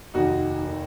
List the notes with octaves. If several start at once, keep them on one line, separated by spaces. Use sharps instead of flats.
F1 D#2 D#3 D#4 F#4
D#3